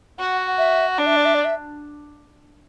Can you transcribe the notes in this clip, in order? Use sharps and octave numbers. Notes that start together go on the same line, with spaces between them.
F#4 F#5
E5
D4 D5
E5
D5
E5
D5
E5